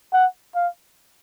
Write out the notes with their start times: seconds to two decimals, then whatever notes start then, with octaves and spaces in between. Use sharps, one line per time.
0.13 F#5
0.55 F5